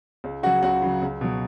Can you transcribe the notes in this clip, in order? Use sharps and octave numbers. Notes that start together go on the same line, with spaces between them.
C#2
C#3 F#3 F#4 F#5
C#2 F#4 F#5
C#3 F#3
C#2
B2 F#3